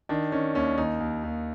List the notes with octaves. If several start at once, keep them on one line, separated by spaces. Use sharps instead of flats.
D#3 D4
D#3 C#4
D#2 C#4
D#2 D#4
D#2
D#2